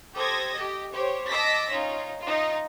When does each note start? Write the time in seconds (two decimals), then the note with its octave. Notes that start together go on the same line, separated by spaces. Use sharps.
0.16 G4 A4 C5 D#6 G#6 A#6
0.56 G4 D#5
0.93 G4 C5 C#5
1.29 D#5 A5 D6 E6 A#6 B6
1.71 C#4 D#4 F4
2.21 D#4 F4